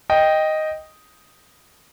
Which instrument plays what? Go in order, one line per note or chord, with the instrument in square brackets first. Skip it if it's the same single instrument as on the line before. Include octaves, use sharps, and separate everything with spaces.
[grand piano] D#5 G5